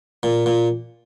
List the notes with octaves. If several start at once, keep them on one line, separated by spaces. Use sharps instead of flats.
A#2
A#2